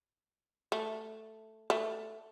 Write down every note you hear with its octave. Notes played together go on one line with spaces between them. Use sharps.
A3
A3